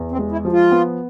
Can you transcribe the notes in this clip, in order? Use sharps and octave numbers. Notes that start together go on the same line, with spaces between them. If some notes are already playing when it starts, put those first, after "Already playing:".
Already playing: E2
C4
G#3
E4
F3
F4
B3